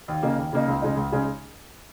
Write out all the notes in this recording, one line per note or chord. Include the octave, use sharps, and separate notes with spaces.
D#2
C#3 A#3 D#4
D#2
C#3 A#3 D#4
C#2
C#3 G#3 D#4
C#2
C#3 G#3 D#4